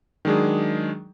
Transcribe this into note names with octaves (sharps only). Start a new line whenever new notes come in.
D#3 F#3 G#3 D4 G#4